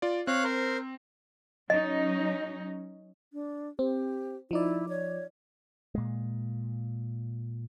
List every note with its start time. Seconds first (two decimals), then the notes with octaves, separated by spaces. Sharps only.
0.02 F4 D5
0.27 C4 C#5 F5 F#6
0.44 A#4 C5
1.70 F#3 C#4 D#4 D#5
3.33 D4
3.79 C4 G4
4.51 F3 D#4 E4 D5
4.89 C#5
5.95 A#2 G#3